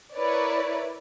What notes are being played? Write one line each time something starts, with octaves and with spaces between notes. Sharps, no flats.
E4 A#4 B4 C#5 D5